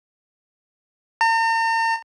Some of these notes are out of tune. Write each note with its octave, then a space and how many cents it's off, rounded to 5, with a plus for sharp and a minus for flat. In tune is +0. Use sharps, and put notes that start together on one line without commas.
A#5 -45